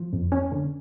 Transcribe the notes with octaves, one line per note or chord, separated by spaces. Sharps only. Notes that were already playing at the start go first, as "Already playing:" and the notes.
Already playing: F3
F2
C#4
D3